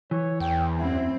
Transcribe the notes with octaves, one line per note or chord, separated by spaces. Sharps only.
E3 C#5
E2 G5
F#2 C4 E4